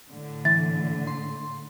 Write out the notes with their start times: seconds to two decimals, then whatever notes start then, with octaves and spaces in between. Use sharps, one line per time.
0.11 A2 D3
0.45 E3 A6
1.07 C6